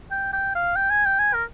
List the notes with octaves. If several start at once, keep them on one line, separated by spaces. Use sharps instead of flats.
G5
G5
F5
G5
G#5
G5
G#5
A#4